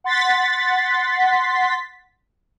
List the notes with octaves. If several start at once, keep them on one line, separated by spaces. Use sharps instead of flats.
F#5 C6 A6 B6